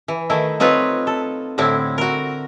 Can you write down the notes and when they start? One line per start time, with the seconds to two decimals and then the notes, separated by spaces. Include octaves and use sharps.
0.08 E3
0.30 D#3 A3 E4
0.60 C4 D#4 F4 B4 C#5
1.07 A4
1.58 A2 D3 C4 E4
1.98 F#4 A#4